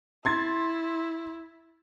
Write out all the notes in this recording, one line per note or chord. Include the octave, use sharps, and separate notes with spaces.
E4 C6 G#6 A6